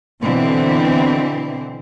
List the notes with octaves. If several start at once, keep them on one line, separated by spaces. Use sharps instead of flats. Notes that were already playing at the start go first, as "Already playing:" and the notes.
B2 D3 E3 C4